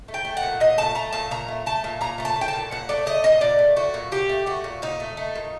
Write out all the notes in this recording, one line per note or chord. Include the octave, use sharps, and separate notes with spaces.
A3
G5
A3
F#5
A#2
A#2 D#5
A3 A5
A3 A#5
A#2 A5
A#2 A#5
A3
A3 A5
A#2
A#2 A#5
A3 A#5
A5
A3
G5
A5
A#2
A#2 F#5
A3 D5
A3 D#5
A#2 D#5
A#2 D5
A3
A3 F#4
A#2
A#2 G4
A3
A3 F#4
A#2
A#2 D#4
A3
A3
A#2